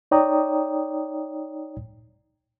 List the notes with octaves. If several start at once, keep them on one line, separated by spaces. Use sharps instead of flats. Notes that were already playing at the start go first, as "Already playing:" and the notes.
D#4 C#5 D5 G5 A#5 D#6